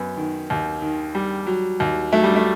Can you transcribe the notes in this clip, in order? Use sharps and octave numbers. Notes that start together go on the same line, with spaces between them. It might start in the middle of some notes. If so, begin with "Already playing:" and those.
Already playing: F#2 F#3 B3
D#3
D#2
D#3
G3
F#3
D#2
F#3 A3
G3
A3